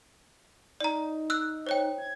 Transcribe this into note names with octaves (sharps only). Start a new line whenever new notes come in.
D#4 D5 A#5
E6 F#6
C5 C#5 G5
G#6